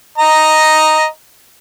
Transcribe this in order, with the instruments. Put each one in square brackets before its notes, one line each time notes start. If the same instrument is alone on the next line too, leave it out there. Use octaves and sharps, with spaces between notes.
[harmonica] D#5 A#5